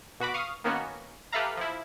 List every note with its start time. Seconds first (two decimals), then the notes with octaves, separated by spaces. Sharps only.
0.20 B2 F#4 B5 D6
0.34 F5 C#6 D#6
0.64 D#3 A#3 B3 C#4 F#4
1.32 G4 A4 B4 E5 F5 A#5
1.57 F3 E4